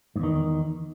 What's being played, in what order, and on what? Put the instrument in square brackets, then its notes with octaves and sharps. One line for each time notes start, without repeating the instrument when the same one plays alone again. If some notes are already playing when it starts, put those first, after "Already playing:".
[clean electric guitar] G#2
E2
D#3